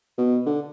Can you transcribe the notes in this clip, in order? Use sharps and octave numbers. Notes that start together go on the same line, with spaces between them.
B2
D3